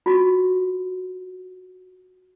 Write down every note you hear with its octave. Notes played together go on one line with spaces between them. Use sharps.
F4 F#4